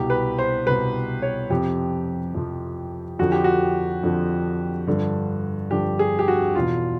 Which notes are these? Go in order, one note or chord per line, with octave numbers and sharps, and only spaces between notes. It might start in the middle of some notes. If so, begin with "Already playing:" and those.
Already playing: C2 B2 G4
B4
C5
C2 B2 B4
C#5
F2 C3 F3 G4
F2 C3 F3
F2 D3 F3 F#4
G4
F#4
F2 D3 F3
G2 D3 F3
G2 D3 F3 G4
G#4
G4
F#4
E2 B2 F4